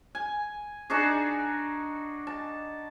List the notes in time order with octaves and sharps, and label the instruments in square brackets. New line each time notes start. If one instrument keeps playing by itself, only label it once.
[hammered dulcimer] G#5
D4 D#4 F#4 G#4
A5